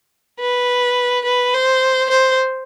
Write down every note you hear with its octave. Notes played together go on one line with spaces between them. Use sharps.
B4
B4
C5
C5